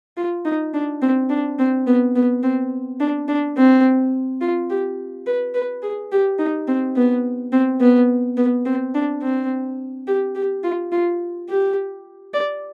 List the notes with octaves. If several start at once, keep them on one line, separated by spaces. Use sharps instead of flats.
F4
D#4
D4
C4
D4
C4
B3
B3
C4
D4
D4
C4
F4
G4
B4
B4
G#4
G4
D#4
C4
B3
C4
B3
B3
C4
D4
C4
G4
G4
F4
F4
G4
D5